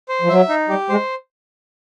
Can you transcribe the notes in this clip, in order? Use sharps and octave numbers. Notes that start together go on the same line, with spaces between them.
C5
F3
F#3 E5
D#4
G3 G4
G#3 C5